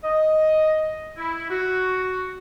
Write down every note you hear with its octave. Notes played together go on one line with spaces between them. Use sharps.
D#5
E4
F#4